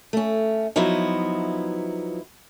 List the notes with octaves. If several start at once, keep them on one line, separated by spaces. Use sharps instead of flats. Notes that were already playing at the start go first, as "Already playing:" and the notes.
A3 C#4
F3 F#3 B3 D#4 E4